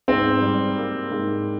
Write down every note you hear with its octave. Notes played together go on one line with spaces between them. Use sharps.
G#2 C4
G3
A#3
G#2